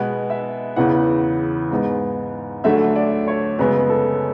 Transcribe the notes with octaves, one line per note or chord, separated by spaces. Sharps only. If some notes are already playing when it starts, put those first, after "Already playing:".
Already playing: B2 G#3 B3 B4
E5
E2 C#3 E3 B3 F#5
G#2 G#3 B3
D2 D3 F#3 A3 E5
D5
C#5
F#2 C#3 G#3 B3 B4
A4